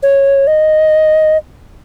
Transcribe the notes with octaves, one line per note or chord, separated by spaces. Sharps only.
C#5
D#5